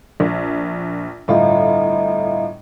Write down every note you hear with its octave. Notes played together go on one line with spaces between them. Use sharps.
A#1
G1 A2 F4 D#5 E5 A#5